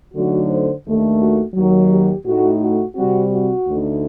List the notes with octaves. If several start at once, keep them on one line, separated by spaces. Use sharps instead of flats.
D3 F#3 A3 D#4 F#4
C5
D#2 D#3 A3 D4
F#4
D#2 D#3 F#3
G4
A2 A3 D#4 F#4
F#4
C3 G3 C4 F#4
F#4
D2 D3 A3 D#4